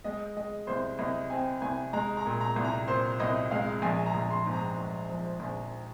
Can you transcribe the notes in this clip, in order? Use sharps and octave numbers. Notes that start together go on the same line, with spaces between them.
G#3 D#5
G#3 D#5
C2 C5
C2 D#5
C4 G#5
C2 G#5
G#3 A#5
A#5
A#2
A#5
C2
A#5
A#2 C5
C2 D#5
G#3 F5
A#1 G#5
A#5
A#1
C6
G#2
A#5
G#2
F3
A#1